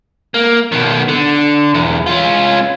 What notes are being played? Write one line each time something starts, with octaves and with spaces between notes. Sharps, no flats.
A#3
B2 D#3
D3
B1 E2
C#4 F4